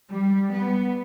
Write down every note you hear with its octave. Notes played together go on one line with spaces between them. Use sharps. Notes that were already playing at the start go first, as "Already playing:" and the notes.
G3
B3